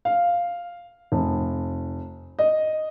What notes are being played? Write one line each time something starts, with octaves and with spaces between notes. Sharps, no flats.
F5
F1
D#5